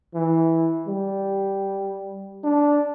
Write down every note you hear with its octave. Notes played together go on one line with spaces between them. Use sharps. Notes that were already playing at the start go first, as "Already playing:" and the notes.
E3
G3
D4